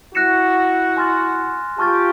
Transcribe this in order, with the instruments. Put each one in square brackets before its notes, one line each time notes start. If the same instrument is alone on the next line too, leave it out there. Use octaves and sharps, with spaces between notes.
[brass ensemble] E4 F#4 [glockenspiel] F#6 A#6 C#7 E7
[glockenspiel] G#5 C6 F6 A6
[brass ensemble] F4 G4 [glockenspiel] A5 C#6 F6 A6